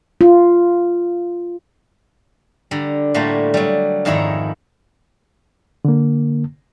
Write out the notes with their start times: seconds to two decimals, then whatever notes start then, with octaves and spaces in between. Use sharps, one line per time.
0.21 F4
2.71 D3 G3 A#5
3.14 A2 G3 A3 A#3 F4 F#4
3.54 F#3 G3
4.05 F2 G#2 D#3 E4 C#5 A#5
5.85 D3 A#3